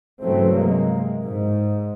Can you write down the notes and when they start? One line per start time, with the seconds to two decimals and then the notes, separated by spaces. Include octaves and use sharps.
0.22 G2 C#3 E3 F#3 A3 C4
0.53 C3 G#3 A#3
1.25 G#2